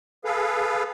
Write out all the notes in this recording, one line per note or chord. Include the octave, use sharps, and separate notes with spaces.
G#4 A4 B4 F5